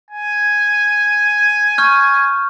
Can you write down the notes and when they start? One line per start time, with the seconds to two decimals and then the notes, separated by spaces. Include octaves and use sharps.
0.11 G#5
1.78 C#6 F6 G6